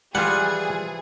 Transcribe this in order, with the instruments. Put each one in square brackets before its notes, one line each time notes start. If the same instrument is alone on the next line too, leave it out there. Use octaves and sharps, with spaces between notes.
[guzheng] E3 F3 B4 [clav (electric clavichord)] G3 F4 [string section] G#4 [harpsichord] F#5